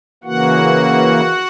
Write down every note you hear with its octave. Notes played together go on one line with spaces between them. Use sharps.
C#3 E3 A#3 F#4 F#5